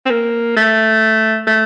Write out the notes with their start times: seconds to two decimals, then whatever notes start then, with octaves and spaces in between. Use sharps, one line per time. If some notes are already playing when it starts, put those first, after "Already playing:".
0.06 C4
0.11 A#3
0.56 A3
1.47 A3